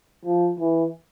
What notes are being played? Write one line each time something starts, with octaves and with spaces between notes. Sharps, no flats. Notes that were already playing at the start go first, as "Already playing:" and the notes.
F3
E3